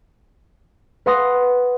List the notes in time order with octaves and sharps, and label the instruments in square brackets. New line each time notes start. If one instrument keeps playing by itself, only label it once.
[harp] B4 F#5 C6 D#6 A#6